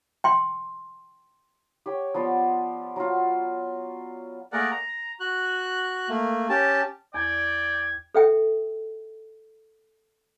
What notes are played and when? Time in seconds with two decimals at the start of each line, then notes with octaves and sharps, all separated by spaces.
0.24 G5 C6
1.86 G4 C#5
2.14 F3 B3 D5
2.96 F#3 F4
4.52 A3 A#3 G#4 A#4 D5 F#5
4.71 A#5
5.20 F#4 F#6
6.09 A3 A#3
6.49 C#4 G4 A5
7.14 E2 D5 G5 G#6
8.15 A4 E5 G5